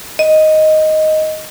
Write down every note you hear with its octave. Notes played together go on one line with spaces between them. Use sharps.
D#5